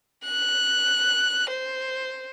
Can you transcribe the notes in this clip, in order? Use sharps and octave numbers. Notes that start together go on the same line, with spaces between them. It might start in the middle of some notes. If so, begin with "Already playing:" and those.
F#6
C5